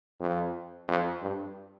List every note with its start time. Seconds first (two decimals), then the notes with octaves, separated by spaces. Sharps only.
0.20 F2
0.88 F2
1.22 G2